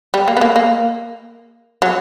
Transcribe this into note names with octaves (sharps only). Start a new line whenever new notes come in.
G3
A#3
B3
A#3
A#3
F#3